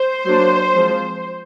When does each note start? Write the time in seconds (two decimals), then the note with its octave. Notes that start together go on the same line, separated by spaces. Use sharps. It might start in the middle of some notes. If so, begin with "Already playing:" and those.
Already playing: C5
0.25 F#3 A#3 D4
0.74 F3 G#3 C4